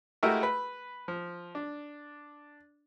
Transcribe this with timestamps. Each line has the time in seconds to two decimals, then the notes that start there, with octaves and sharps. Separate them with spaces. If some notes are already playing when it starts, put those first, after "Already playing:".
0.23 G#3 A3 E4 F#4 G4 A#4
0.43 B4
1.08 F3
1.55 D4